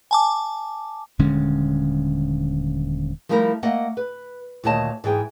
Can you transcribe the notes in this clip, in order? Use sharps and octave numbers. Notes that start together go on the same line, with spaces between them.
G#5 A5 D6
D#1 D3 G#3 C#4
F3 G3 A3 E4 A#4
A3 A#3 D#5 F#5
B4
D2 A#2 D#3 C#5 D#5 A5
G#2 E3 G#4 G5